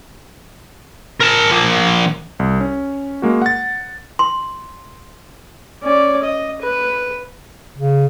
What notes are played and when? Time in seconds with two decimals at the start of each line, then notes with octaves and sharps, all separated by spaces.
1.21 A#4 A5
1.51 F3 A#3
2.39 C2
2.61 C#4
3.22 G#3 A#3 F#4
3.42 F#5 A6
4.19 C6
5.83 C#4 D5
6.23 D#5
6.62 B4
7.78 C#3